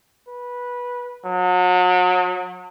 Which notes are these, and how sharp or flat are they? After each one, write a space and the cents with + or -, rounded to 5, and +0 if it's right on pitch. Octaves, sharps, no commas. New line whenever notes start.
B4 -15
F#3 -35